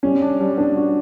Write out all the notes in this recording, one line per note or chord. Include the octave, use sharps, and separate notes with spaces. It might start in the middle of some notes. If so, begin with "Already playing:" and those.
G3 C#4
D4
G3
B3 D4
F#4